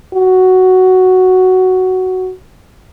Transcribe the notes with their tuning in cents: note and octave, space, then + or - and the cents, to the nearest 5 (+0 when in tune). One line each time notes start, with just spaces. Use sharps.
F#4 +5